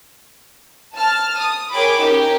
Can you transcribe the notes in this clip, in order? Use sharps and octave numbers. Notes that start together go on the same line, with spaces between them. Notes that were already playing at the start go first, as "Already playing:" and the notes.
A5 F6
D#6
G#4 A#4 C#5 G5 B5 D6
C#4 D#4 G4 A#4